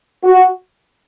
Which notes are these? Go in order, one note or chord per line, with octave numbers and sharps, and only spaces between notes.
F#4